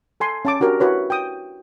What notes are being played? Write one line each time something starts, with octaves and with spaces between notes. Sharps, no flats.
A4 G#5 C6
C#4 A5 D6
D4 F#4 G4 A#4
E4 F#4 B4 C#5
G5 D#6